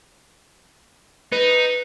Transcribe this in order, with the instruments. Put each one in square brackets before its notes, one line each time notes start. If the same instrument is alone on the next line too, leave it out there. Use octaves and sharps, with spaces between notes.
[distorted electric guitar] D#4 [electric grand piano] B4